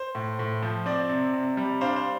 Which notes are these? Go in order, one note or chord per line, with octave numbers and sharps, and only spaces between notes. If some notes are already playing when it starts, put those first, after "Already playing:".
Already playing: C5
A2
A2
F3
C4 D5
C3
C3
G3
D4 C5 F5
C5